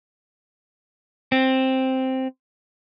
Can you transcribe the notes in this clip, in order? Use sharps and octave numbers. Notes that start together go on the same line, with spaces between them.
C4